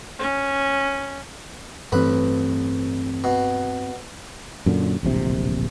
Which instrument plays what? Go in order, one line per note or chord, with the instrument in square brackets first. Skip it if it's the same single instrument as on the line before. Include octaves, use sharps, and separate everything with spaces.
[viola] C#4
[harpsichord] A1 B4 [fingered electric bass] G2 C4
[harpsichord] B2
[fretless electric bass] F#2 A#2 D3
D1 A#1 C3